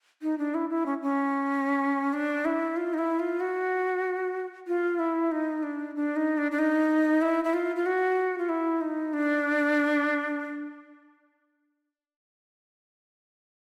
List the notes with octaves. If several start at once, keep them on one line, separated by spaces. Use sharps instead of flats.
D#4
D4
E4
E4
C#4
C#4
D4
E4
F4
D#4
E4
F4
F#4
F4
E4
D#4
D4
D4
D#4
D4
D4
D#4
E4
E4
F4
F4
F#4
F4
E4
D#4
D4